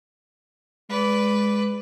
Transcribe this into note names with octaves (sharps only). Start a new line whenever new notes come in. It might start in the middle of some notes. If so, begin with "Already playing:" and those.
G#3 B4 D5